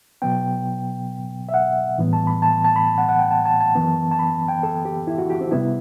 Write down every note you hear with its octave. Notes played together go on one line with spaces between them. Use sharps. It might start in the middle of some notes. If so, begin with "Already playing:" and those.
B2 F#3 B3 G5
E5
F#5
A2 E3 G3 B3
A5
B5
A5
A5
B5
A5
F#5
F#5
G5
A5
A5
A5
F#2 E3 B3
A5
B5
G5
A4
G4
E4
F#4
G4
C4
C3 G3 B3 E4